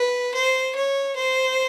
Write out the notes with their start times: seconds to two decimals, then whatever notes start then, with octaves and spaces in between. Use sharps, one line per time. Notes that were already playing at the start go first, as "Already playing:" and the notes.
Already playing: B4
0.34 C5
0.75 C#5
1.16 C5